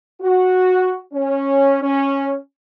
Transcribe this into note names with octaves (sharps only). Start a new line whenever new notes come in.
F#4
C#4
C#4